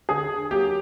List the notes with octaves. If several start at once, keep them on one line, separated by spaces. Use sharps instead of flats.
D3 G#4
F#3 A#3 G4